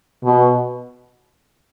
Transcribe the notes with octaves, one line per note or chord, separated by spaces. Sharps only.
B2